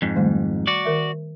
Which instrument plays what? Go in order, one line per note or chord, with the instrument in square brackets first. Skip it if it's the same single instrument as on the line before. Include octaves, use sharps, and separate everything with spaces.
[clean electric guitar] F2 G#2
[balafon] D#3 G3 A3
[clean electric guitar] F#4 D5
[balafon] D#3 A#4 E5